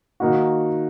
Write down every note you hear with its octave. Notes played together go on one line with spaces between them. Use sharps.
D#3 A#3 D#4 F#4